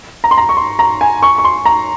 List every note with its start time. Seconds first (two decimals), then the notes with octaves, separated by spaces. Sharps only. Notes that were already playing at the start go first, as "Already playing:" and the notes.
0.24 A#5
0.31 C6
0.38 A#5
0.49 C#6
0.57 C6
0.79 A#5
1.01 G#5
1.22 C#6
1.38 C#6
1.45 C6
1.65 A#5